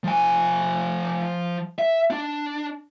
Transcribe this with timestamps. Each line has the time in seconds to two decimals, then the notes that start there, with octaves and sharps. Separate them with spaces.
0.04 F3 G#5
1.79 E5
2.10 D4